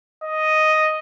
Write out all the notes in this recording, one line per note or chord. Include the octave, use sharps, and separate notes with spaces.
D#5